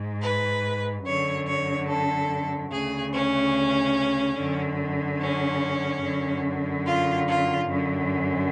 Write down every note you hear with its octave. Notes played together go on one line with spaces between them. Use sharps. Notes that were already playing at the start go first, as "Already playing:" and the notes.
Already playing: G#2
B4
F#2 D3 C#5
C#5
A4
D2 C#3 G#4
C#4
F#2 D3
C#4
F#2 D3
F4
F4
F#2 D3